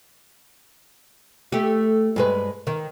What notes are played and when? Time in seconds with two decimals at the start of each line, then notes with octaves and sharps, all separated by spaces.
1.52 A3 G4
2.16 G2 G#3 B4
2.67 D#3